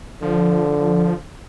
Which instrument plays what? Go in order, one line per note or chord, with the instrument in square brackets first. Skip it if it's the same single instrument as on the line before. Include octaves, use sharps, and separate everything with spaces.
[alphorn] D3 [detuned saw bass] F3